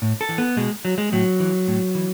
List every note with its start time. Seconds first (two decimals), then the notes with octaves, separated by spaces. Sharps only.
0.02 A2
0.21 A4
0.29 E3
0.38 B3
0.57 B2 G#3
0.85 F#3
0.98 G#3
1.12 A2 F#3
1.40 E3
1.68 A2
1.95 E3